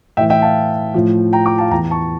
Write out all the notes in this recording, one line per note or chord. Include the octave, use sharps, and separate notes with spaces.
A2 E3 E5 G5
E5 G5
F5 A5
A2 F3
G5 A#5
A#5 D6
F5 A5
E2 E3 G5 A#5
A5 C#6